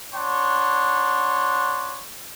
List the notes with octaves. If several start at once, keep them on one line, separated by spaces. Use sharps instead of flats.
D4 C#5 F#5 C6